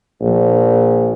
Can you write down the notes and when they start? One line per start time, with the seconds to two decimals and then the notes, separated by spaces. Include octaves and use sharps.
0.21 A#1